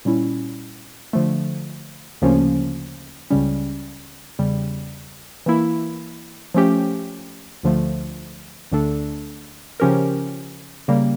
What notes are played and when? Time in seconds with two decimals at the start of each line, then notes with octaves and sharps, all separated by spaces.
0.05 A#2 G3 C#4 E4
1.13 D3 F3 A3
2.22 D2 C#3 F3 A#3 C#4
3.31 C#2 C#3 G3 C#4
4.39 E2 C#3 G3
5.46 E3 A#3 E4
6.54 F3 A3 C#4 G4
7.63 D2 D3 F3 A3
8.72 D2 D3 A3 D4 A4
9.80 C#3 F3 C#4 G4 A#4
10.88 C#3 G3 A#3